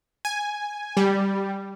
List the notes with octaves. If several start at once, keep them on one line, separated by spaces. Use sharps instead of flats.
G#5
G3